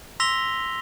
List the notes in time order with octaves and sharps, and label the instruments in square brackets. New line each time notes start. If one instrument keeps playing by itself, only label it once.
[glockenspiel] C6 E6 A#6 B6 F7 G7